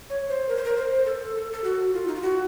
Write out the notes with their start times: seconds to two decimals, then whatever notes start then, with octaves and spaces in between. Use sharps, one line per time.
0.10 C#5
0.29 C5
0.48 A#4
0.57 C5
0.65 A#4
0.77 C5
1.06 A4
1.36 A4
1.53 A4
1.64 F#4
1.94 F4
2.07 D#4
2.15 F4
2.22 F#4